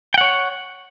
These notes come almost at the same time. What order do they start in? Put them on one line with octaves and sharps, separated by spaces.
G5 F#5 C#5